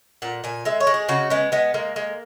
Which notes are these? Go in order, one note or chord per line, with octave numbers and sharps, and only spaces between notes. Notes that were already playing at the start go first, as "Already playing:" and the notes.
A#2 F#5
A#2 G#5
G#3 E5
C#5
G#3
G#4
C#3 F#4
G#3 B3
G#3 B3
G#3 A#3
G#3